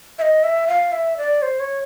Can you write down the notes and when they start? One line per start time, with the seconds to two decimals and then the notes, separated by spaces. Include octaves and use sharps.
0.19 E5
0.22 D#5
0.44 E5
0.68 F5
0.92 E5
1.17 D5
1.42 C5
1.60 C#5